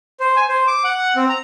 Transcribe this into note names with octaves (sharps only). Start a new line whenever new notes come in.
C5
G#5
C5
D6
F#5
C4
A#5